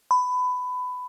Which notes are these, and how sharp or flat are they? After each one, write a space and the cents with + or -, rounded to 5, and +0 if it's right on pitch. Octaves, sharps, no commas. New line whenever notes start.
B5 +20